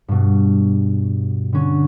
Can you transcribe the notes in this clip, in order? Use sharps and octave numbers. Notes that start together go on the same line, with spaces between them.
G2 B2
D3 C#4